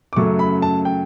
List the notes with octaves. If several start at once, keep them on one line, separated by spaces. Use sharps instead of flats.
D6
F#2 C#3 F#3 A3 C#6
B5
A5
G5